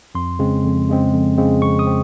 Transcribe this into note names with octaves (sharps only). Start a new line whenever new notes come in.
F2 C6
C#3 G#3 C4
F2
C#3 G#3 C4
F2
C#3 G#3 C4
F2 C#6
D#6
C4